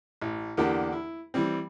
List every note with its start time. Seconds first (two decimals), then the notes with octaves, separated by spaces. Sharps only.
0.22 A1
0.57 E2 D3 A#3 D4 G4 G5
0.92 E4
1.34 E3 G3 C4